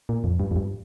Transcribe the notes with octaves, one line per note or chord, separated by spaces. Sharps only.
A#2
F2
G2
F2
G2